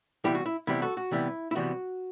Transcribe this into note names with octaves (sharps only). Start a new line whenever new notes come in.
C3 E3 G3 B3 E4 G4
F#4
E4
C3 E3 G3 B3 E4 G4
F#4 A4
F#4
C3 E3 G3 B3 E4
E4
C3 E3 G3 B3 F#4